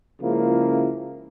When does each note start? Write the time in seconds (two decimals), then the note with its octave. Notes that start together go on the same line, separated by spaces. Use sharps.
0.22 C#2 C#3 F3 A#3 E4